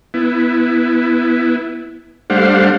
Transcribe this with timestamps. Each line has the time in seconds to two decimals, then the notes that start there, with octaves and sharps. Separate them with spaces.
0.14 B3 E4
2.30 G3 A3 D4 C5 F5 F#5